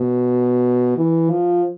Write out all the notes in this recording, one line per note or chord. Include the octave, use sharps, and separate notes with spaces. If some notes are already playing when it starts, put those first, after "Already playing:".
Already playing: B2
E3
F3